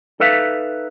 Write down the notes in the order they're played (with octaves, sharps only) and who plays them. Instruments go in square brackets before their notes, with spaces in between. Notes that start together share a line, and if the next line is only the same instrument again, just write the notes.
[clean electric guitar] D#4 A4 B4 E5 F5